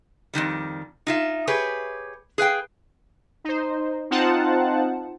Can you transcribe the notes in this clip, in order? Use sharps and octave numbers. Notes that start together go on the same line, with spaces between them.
F2 G#2 D#3 G3
D#4 F4 E5
G4 G#4 B4 C#5
G#4 B4 F5 G5
D#4 C5
C4 D#4 F4 C5 F#5 A5